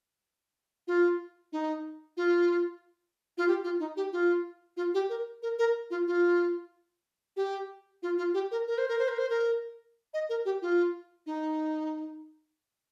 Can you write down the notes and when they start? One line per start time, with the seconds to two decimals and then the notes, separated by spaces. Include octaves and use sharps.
0.87 F4
1.53 D#4
2.17 F4
3.38 F4
3.48 G4
3.64 F4
3.80 D#4
3.97 G4
4.12 F4
4.77 F4
4.94 G4
5.09 A#4
5.42 A#4
5.59 A#4
5.90 F4
6.07 F4
7.37 G4
8.03 F4
8.18 F4
8.34 G4
8.51 A#4
8.68 A#4
8.78 C5
8.88 A#4
8.99 C5
9.08 A#4
9.18 C5
9.30 A#4
10.14 D#5
10.29 A#4
10.45 G4
10.62 F4
11.26 D#4